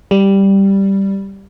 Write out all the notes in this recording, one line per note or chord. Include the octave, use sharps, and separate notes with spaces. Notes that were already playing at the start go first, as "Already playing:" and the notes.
G3